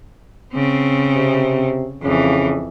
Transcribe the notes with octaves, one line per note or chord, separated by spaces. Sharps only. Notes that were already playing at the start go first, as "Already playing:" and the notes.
C#3 C4
C3
F2 C#3 E3